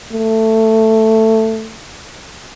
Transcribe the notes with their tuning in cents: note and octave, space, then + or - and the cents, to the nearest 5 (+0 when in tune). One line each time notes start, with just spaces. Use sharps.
A3 +10